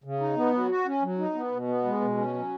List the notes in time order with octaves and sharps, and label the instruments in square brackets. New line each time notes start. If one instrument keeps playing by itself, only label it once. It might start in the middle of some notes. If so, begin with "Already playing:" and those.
[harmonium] C#3
D#4
B3
F#3
F#4
C#4
F#3
D#4
B3
B2
B3
G#3
B2
C#4
F#3